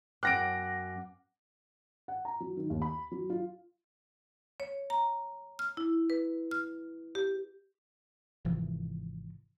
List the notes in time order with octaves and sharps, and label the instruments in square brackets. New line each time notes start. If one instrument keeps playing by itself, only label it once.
[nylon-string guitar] F#2 B3 G5 [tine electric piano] F#5 D6 [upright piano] F#6 A#6 D7
[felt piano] F#5
A#5
F#3
D#3
D#2
B5
F#3
F4
[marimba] C#5
A#5
F6
E4
B4
F6
G4
[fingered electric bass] G#1 C3 E3 F3